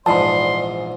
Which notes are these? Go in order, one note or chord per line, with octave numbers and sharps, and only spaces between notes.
A#1 E2 G#2 D5 A5 B5 C6